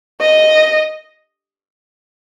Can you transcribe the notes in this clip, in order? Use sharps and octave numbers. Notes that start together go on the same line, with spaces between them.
D#5